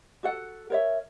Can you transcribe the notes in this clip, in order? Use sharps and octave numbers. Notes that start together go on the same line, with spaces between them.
F#4 A4 F#5
A#4 C#5 E5